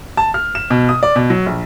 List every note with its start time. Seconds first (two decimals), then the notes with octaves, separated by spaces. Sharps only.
0.17 A5
0.34 F6
0.55 E7
0.70 B2
0.89 D#6
1.03 D5
1.16 B2
1.30 F#3
1.46 A#1